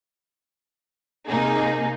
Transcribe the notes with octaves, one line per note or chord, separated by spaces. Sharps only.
C3 A#3 D#4 G#4